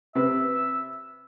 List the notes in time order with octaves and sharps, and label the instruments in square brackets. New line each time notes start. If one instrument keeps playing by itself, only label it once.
[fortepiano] C3 B4 [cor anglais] E5